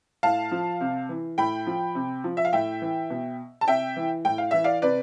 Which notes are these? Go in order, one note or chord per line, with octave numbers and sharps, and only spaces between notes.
A2 F5 A5
F3
C3
E3
A2 G5 B5
F3
C3
F3
E5
F5
A2 E5 G5
E3
B2
A5
C3 E5 G5
E3
A2 G5
F5
E3 E5
D5 F5
C3 B4 D5